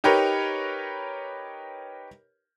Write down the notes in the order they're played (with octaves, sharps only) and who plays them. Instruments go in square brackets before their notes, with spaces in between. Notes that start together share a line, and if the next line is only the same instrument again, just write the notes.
[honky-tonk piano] D#4 G4 A#4 B4 C#5